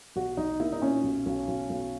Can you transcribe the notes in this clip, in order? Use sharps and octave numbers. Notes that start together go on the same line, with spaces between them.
B1 F#4
B1 D#4
A#3 E4
D#4
A#2 C#4
B1
B1
B1
B1